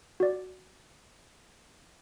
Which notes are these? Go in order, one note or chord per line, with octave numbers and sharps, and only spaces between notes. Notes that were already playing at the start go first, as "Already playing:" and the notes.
F#4 D5